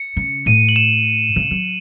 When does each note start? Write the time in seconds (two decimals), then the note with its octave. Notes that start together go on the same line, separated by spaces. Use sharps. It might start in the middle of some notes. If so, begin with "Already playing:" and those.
Already playing: C#7
0.17 C#3
0.46 A2 D#7
0.69 F#7
0.76 E7
1.36 C#3
1.51 F#3